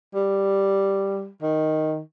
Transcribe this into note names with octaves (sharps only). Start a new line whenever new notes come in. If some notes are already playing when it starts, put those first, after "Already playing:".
G3
D#3